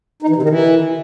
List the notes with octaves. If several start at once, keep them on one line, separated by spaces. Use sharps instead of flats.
D#4
E3
C3
D#3
E3